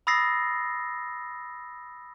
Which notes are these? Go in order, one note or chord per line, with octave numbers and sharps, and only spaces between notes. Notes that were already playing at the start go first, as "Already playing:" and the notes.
B5 D#6 E6 A6 A#6 C7